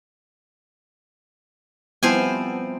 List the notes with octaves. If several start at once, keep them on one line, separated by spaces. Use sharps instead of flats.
F3 G3 B3 C4 E4 G#5